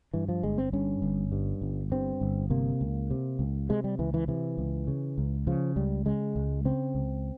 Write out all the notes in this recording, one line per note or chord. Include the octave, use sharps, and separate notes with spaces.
G2 E3
F3
G1 G#3
C4
G2 C#4
G1
G2
G1
G2 C4
G1
C3 A#3
C#2
C3
C#2
C3 G#3
G3
C#2 E3
E3
C3 E3
C#2
C#3
C#2
C#3 F3
C#2 G3
C#3 G#3
C#2
C#3 C4
C#2